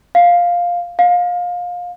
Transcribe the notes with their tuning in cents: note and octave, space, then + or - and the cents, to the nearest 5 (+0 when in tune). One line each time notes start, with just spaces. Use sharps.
F5 +5
F5 +25